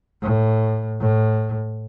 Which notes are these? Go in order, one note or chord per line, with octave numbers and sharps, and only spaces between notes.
A2
A2